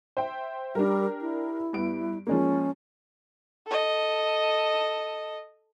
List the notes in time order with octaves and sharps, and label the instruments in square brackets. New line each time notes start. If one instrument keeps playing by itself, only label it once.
[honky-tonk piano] C5 E5 G5
[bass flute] G3 [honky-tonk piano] D4 G4 A#4
[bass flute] E4
[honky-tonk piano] G2 B3 D7
[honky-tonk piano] F3 G#3 A#3 [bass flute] C#4
[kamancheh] A4 D#5